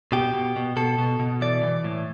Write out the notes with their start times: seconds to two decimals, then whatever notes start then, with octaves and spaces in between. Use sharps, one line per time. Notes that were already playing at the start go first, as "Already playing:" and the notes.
0.12 B2 G4
0.34 B2
0.56 B2
0.76 B2 A4
0.98 B2
1.19 B2
1.41 E3 D5
1.63 E3
1.84 A2